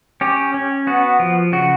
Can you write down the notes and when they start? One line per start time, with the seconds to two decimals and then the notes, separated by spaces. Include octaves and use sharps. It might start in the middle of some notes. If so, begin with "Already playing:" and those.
0.21 C#4 G4
0.54 C#4
0.87 B3 F#4
1.20 F3
1.53 C#3 F#4